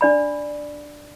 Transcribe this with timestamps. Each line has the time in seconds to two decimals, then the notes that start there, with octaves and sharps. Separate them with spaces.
0.01 D4 D5 B5